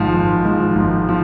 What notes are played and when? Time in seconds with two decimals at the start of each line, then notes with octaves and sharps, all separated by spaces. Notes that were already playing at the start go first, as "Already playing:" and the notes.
Already playing: G#1 G#2 F3
0.14 G#1
0.44 G#2 F3
0.75 G#1
1.09 F3